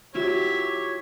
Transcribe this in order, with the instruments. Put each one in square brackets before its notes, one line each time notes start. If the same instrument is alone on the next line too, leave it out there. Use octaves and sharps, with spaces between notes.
[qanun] F#3 E4 F4 [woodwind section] G4 [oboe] C#5 [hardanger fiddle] E5